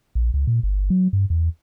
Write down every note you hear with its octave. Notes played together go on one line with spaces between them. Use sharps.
A#1
C#2
A#2
G1
F#3
G2
E2